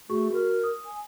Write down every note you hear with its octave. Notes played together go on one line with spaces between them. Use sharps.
A3 F#4 G#4 C#6
F#4 A#4
D#6
G#5